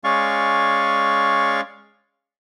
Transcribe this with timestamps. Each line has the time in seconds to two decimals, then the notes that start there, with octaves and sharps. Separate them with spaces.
0.04 G#3 C#4 D5 F5 C#6